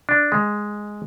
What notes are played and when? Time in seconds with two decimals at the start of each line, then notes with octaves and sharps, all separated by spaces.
0.09 D4
0.32 G#3